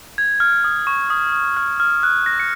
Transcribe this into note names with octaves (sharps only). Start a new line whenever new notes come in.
G#6
F6
D#6
C#6
D#6
D#6
F6
F6
F#6
A#6
C#7